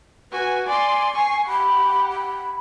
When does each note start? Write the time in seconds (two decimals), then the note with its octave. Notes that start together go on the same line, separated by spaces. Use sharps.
0.32 F#4 B4 G#5
0.68 D5 G#5 C6
1.15 C#6 C7
1.48 G4 F#5 B5
2.11 B5